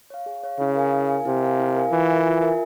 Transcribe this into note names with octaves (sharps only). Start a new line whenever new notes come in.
C#5 F5
G#4
C#5 F5
C#3 E4
A#4 F5 G#5
E4
A#4 F5 G#5
C3 E4
A#4 F5 G#5
E4
A#4 F5 G#5
E3 F4
A#4 E5 G#5
F4
A#4 E5 G#5